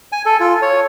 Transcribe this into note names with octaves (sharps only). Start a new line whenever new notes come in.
G#5
A4
F4
C#5